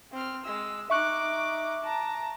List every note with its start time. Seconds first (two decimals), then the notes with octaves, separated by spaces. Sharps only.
0.12 C4 F6
0.44 G#3 E6
0.90 D#4 E5 C#6 D6 F#6
1.83 A5 A#5